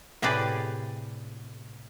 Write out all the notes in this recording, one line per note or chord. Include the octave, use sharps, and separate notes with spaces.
A2 C3 G4 G#4 B4 D5